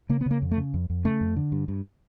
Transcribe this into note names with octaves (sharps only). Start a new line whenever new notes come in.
C#3 A#3
B3
C#3 A#3
F2
A3
C#3
F2
F2
C#3 A3
F2
D3
G2
G2